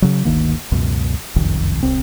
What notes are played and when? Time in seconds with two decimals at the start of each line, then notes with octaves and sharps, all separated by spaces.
0.02 C#3 F#3
0.25 G1 D2 D#3 A#3
0.72 C#2 F#2 B2
1.36 F#1 C2 F2 D#3
1.83 D1 C2 C4